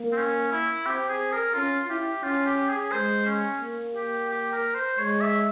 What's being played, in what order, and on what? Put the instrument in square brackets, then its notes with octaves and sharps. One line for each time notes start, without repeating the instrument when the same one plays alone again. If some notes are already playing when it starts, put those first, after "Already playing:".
Already playing: [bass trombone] A#3
[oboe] C4
C#4
E4
[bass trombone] C4 [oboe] G4
[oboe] G#4
A#4
[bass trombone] C#4 [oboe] F4
[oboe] F4
[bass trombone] E4 [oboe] G4
[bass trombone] C#4 [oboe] F4
[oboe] G4
G#4
[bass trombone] G#3 [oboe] C5
[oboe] C#4
[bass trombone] A#3
[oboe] G4
G4
A#4
C5
[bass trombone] G#3 [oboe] C#5
[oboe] E5